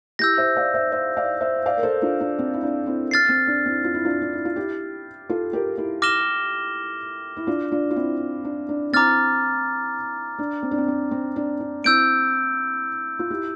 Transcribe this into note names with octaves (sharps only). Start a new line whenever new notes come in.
E4 G4 E6 G6 A#6
C5 E5
D5 F5
C5 E5
C5 E5
D5 F5
C5 E5
D5 F5
A#4
A4 C5
D4 F4
D4
C4
E4
D4
C4 E4
F6 A6 C7
C4
D4
C4 E4
F4
E4
D4 F4
D4
E4
F4
E4 G4
F4 A4
G4 A#4
E4 G4
D6 F6 A#6 E7 G7
E4
D4 F4
D4 F4
F4
C4 E4
D4
D4
C4 E4 A#5 D6 F6 A6
D4
C4
D4
C4
C4
C4
D4
D4
C4 E4 E6 G6 D7
F4
E4 G4